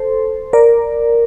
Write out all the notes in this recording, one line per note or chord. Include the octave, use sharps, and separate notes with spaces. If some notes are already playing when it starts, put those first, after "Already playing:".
Already playing: A4 C5
A#4 D5